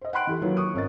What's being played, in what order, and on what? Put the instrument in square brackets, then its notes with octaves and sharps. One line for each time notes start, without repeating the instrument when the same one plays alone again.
[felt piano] C5 D#5
F#5 G5 B5 C6 F#6 D7
E3 G4 A4
D#3 F#3 A#3 F4 B4 C#5
C#6 D#6
G#1 C#4 A#4 D#5 A6